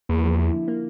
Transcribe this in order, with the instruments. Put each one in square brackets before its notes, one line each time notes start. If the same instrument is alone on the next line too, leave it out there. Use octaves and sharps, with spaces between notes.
[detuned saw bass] E2 [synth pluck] A#3
[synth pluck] F3
E4
D3
A#3